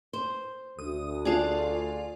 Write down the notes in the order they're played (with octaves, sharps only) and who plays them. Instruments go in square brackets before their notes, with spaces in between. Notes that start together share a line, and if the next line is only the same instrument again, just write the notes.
[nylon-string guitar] C5
[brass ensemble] D2 [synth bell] D#6
[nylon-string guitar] D4 G#4 [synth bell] F4 D5